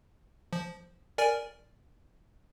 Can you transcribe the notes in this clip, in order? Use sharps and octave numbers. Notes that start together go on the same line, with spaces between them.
F3
A#4 D5 G#5